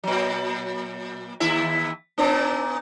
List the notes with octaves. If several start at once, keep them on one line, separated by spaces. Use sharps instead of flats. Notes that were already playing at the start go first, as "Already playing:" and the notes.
A#2 F#3
D#2 E4 E5
A#2 B3 D4